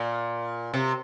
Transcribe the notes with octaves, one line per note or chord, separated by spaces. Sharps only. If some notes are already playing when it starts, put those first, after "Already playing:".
Already playing: A#2
C3